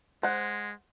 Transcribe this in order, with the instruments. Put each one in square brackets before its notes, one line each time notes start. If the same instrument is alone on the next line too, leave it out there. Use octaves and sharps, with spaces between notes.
[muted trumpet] G#3 [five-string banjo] C5 F#5